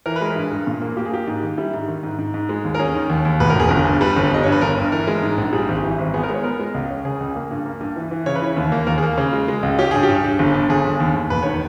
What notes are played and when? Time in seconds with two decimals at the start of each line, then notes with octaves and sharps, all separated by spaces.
0.06 E3 A#4
0.16 B4
0.21 G#3 A#4
0.36 G2
0.52 G2
0.67 A#2
0.82 A#3
0.97 A#3 G4
1.05 G#4
1.12 A#3 G4
1.27 G#2
1.42 D#3
1.58 G3 E4
1.73 G#2
1.88 D#3
2.03 G#2
2.19 G#2
2.34 G#2
2.49 G#3
2.64 D#2
2.75 A#4
2.79 C#4 G#4
2.94 D#3
3.10 D#2
3.25 D#2
3.40 E1 B4
3.50 A#4
3.55 E1 G#4
3.69 G1 A#4
3.85 G2
4.01 G3 B4
4.17 G1
4.31 G1 D#5
4.43 G2 C#5
4.52 B4
4.61 G1 A#4
4.77 G2
4.92 E3 A#4
5.07 G#3
5.23 G#2
5.38 A#1
5.53 G3 G#4
5.68 G#1
5.84 E3
5.98 G#1
6.14 B3 G#4
6.23 A#4
6.29 G#3 C#5
6.44 B3 A#4
6.59 G#3
6.74 C#2
6.90 C#4
7.05 C#3 G#4
7.20 C#2
7.36 A#3
7.51 G2
7.66 A#3
7.81 G2
7.96 E3
8.11 E3
8.26 C#3 C#5
8.35 B4
8.42 E3 C#5
8.57 D#2
8.72 A#3
8.87 D#2 A#4
8.98 G#4
9.03 A#3
9.18 C#3
9.33 G#3
9.48 G#3
9.63 C#2
9.78 C#4 G4
9.91 G2 G#4
10.03 G4
10.09 G2
10.24 G2
10.39 G1
10.54 G2
10.69 G1 G#4
10.85 G1
11.00 D#2
11.15 D#2
11.30 E1 B4
11.43 D#3 C#5